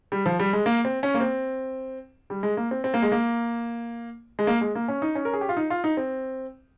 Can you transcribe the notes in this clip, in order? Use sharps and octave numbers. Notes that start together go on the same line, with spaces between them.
G3
F3
G3
G#3
A#3
C4
C#4
A#3
C4
G3
G#3
A#3
C4
C4
A#3
G#3
A#3
G#3
A#3
G#3
A#3
C#4
D#4
C#4
A#4
G#4
G4
F4
D#4
F4
D#4
C4